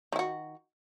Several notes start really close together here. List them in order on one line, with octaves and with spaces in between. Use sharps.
D#3 E4 F#4